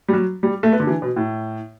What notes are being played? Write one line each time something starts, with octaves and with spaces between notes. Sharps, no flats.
G3
F#3
G3
A3
B3
D3
E3
B2
A2